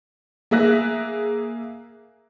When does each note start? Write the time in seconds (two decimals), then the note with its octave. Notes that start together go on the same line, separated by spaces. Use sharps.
0.51 A#3 G#4 E5 F#6 A#6